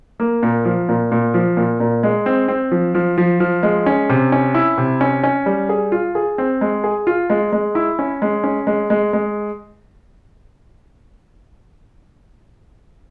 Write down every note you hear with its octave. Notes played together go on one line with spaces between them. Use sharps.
A#3
A#2
F3
A#2
A#2
F3
A#2
A#2
G#3
C4
C4
F3
F3
F3
F3
G#3
C#4
C3
C#4
E4
C3
C#4
C#4
G3
G#4
F4
G#4
C4
G#3
G#4
F4
G#3
G#3
E4
C#4
G#3
C#4
G#3
G#3
G#3